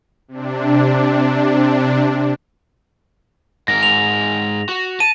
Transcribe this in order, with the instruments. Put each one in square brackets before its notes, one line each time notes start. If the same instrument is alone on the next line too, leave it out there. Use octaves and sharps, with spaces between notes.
[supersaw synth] C3 D4
[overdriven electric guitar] G#2 A#4 [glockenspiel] A#6
[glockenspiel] F7
[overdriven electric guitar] F#4
[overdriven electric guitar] A5 [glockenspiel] D#7